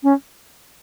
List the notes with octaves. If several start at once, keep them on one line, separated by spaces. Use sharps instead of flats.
C#4